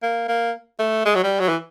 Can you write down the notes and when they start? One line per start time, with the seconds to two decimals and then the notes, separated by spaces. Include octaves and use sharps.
0.03 A#3
0.28 A#3
0.79 A3
1.06 G#3
1.15 F#3
1.23 G3
1.40 F#3
1.49 E3